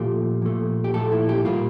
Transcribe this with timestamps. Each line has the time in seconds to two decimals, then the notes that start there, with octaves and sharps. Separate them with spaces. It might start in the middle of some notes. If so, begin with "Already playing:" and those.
Already playing: A#2 F3 A3 G4
0.42 A#2 F3 A3
0.84 G4
0.94 A#2 F3 A3 A4
1.12 E4
1.29 G4
1.45 A#2 G3 A#3 F4